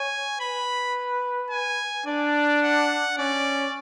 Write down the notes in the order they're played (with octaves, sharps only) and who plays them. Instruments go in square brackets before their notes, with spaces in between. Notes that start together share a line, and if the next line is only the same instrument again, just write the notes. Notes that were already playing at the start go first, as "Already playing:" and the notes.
Already playing: [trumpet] C#5 [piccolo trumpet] G#5
[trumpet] B4 [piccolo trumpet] B5
[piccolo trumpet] G#5
[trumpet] D4 [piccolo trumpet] D5
[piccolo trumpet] F#5
[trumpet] C#4 [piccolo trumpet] D5